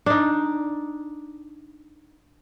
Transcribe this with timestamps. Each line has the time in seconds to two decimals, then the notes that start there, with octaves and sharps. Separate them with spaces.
0.06 D4 D#4